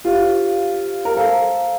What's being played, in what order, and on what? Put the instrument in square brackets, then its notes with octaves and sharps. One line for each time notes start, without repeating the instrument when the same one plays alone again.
[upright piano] F4 [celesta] G4 C5 F5
[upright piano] A#4
[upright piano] A4 [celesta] C5 F5 A#5